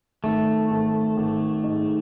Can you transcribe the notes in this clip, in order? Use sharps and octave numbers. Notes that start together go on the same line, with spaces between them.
G#1 A3
G#1
G#1
G#2